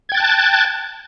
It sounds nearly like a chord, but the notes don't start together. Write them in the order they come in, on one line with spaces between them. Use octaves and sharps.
G#6 G5 A6 F#6 A5